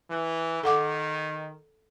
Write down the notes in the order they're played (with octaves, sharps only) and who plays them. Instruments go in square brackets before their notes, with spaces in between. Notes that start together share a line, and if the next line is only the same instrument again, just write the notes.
[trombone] E3
[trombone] D#3 [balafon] A4 F#5 D6